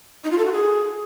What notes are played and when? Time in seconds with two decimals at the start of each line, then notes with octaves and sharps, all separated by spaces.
0.24 D#4
0.31 F4
0.38 A4
0.45 F#4
0.52 G#4